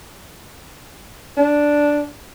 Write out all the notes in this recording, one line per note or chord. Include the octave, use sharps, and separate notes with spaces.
D4